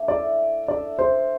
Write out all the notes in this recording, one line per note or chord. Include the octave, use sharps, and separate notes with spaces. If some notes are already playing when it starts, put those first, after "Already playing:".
Already playing: A3 D4
E4 A4 D5 E5
D4 A4 D5 E5
C5